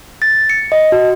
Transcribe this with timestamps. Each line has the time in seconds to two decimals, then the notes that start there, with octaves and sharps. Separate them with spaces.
0.22 A6
0.50 C#7
0.72 D#5
0.92 F#4